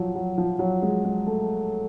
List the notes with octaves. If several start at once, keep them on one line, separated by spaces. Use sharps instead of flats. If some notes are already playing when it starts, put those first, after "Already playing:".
Already playing: F3 F#3
F#3
F3
F#3
G#3
G#3
A3